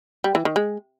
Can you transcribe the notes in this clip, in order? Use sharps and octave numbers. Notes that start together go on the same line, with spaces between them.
G3
E3
D#3
G#3